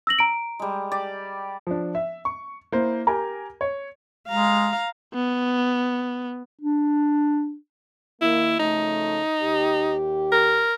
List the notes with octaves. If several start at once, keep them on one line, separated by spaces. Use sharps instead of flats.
E6 A#6 F#7
A#5 D7
G3 G#3
G4 D5
F3 D4
E5
C#6
A#3 E4 C5
G4 A#4 G#5 A#5
C#5
G#3 F5 A#5
B3
D4
D#3 A#3 E4
C#3 F3 A3 D#4
D#2 G4
A#4